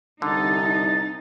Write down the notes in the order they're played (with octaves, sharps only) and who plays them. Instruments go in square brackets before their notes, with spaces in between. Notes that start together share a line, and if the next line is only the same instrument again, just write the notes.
[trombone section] C2 [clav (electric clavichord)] D3 [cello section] D#4 [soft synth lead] A6